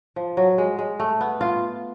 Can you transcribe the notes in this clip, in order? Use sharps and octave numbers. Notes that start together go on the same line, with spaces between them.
F3
F#3
G#3
G#3
A3
B3
F4